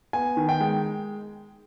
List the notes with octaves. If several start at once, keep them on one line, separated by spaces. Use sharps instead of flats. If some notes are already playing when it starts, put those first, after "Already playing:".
B3 G#5
D#3
G5
G#3